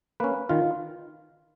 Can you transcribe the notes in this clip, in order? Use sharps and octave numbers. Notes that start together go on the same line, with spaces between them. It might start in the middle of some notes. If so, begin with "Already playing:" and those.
A#3 C#4 B4
D#3 F4